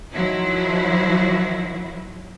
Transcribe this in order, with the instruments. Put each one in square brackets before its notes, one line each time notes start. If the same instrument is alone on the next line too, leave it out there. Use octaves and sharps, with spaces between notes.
[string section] D#3 F3 F#3 E4